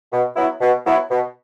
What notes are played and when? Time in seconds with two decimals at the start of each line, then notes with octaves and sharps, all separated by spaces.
0.12 B2
0.36 F#3 B3 E4
0.61 B2
0.86 F#3 B3 E4
1.10 B2